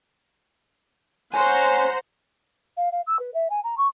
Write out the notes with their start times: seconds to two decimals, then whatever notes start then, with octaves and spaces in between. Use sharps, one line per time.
1.34 C5 C#5 F#5 G#5 A#5
2.77 F5
2.92 F5
3.06 E6
3.19 B4
3.34 E5
3.50 G#5
3.63 A#5
3.77 C#6